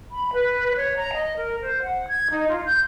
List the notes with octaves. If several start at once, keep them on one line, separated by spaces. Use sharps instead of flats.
B5
B4
C#5
A#5
D#5
A#4
C5
F#5
G#6
D#4
F4
G6